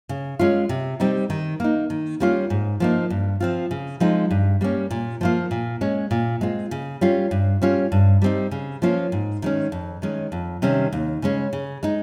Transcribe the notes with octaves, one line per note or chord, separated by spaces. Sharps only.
C#3
G#3 C#4 F4
C3
G3 C4 D#4
D#3
A#3 D#4
D#3
G3 A#3 C#4 F4
G#2
F3 A#3 D#4
G2
F3 C4 F4
C#3
F3 G#3 C4 D#4
G2
G3 A#3 C#4
A#2
F3 A#3 F4
A#2
G#3 C#4
A#2
G#3 C4 F4
C#3
G3 C#4 F4
G2
G3 C#4 F4
G2
G3 C4 D#4
C#3
F3 A#3 C#4 F4
G#2
D#3 G#3 C#4
F2
D#3 G#3 C#4
F2
C3 D#3 G3 C#4
D#2
C#3 G#3 C#4
C#3
G#3 D#4